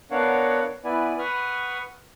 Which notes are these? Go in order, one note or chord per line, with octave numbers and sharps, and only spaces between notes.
B3 D4 A#4 C#5 F5 F#5
B3 E4 B4 D5 G#5
B4 F#5 B5 C#6 D#6 F6